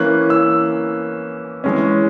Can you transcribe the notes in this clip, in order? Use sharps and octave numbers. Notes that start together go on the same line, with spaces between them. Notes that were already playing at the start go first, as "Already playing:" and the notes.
Already playing: E3 A#3 C#4 F#6
E6
E3 G#3 C#4